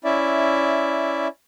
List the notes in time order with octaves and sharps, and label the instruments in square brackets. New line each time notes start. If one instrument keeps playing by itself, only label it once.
[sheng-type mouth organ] C#4 E4 D5 E5